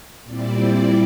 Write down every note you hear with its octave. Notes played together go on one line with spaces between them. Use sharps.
A#2 G3 C4 E4 D5